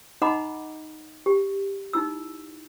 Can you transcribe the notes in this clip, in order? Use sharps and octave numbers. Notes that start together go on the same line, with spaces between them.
D#4 D#5 F#5 A#5 B5 D6
G4
D#4 E4 E6